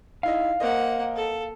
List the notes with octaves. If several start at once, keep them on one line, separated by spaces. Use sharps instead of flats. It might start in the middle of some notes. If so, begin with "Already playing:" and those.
D#4 E4 D#5 F5
A#3 A#4 C5 D#5 F#5
A4